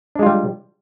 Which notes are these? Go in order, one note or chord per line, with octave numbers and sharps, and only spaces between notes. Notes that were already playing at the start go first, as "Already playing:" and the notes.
G3 G#3 D4 F4